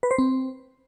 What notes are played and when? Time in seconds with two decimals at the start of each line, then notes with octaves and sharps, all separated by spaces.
0.03 B4
0.11 C5
0.18 C4